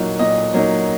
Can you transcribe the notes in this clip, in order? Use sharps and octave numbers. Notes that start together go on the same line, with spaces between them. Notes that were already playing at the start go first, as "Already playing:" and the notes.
Already playing: A#2 F#3 A#3 D#4
A#2 D#5
F#3 A#3 D#4